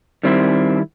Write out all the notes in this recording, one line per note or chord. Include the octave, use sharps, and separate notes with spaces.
D#3 G3 C4 E4